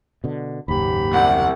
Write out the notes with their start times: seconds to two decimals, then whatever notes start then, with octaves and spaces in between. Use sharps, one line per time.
0.24 B2 D3
0.68 F#1 D#2 G#2 G4 B5
1.13 C2 F#5